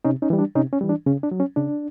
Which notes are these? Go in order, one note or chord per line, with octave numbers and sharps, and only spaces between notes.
C3 C#4 D#4
C#4 D#4
E3 G3
D4
C3 C#4 D#4
C#4
E3 G3
D4
C#3 C#4
D4
F#3
C#4
C#3 D4